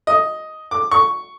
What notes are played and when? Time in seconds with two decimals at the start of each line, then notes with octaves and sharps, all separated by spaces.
0.07 D#5
0.71 D6
0.91 C#6